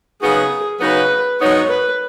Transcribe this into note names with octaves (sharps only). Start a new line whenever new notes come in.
C#3 F#3 B3 D#4 F#4 G#4
C#3 F#3 B3 D#4 F#4 B4
G#2 F#3 B3 D#4 C#5
B4